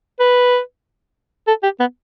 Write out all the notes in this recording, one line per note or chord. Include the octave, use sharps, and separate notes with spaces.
B4
A4
G4
B3